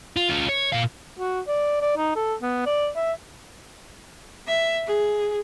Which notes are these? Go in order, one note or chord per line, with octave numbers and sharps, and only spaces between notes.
F4
C#4 F4
C#5
A#2 F5
F#4
D5
D5
D#4
A4
B3
D5
E5
E5
G#4